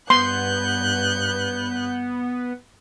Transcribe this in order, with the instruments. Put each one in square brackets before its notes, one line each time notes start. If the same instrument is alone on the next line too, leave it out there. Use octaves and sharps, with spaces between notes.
[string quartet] G2 F#6 G6 [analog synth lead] B3 [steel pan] C6